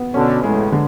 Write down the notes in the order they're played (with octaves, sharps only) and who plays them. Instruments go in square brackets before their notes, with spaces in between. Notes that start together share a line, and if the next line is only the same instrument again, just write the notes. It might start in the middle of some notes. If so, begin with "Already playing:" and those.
Already playing: [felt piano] B3
[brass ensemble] B2 D3 [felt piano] C#4
[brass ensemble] A2 C#3 [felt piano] G#3
[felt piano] D3